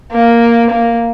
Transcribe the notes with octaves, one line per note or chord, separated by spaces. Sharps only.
A#3
A#3